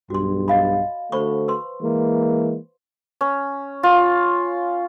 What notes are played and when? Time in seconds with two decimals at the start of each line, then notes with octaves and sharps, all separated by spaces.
0.10 B1 G2 F#4 C6
0.48 D#5 F5 B5
1.12 D3 A3 F#4 C5 B5 C#6
1.48 B4 C6
1.81 E3 G#3 A#3
3.21 C#4
3.83 F4